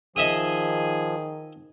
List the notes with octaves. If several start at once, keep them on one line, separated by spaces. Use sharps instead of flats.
D#3 F3 G#4 D#5 E5 D#6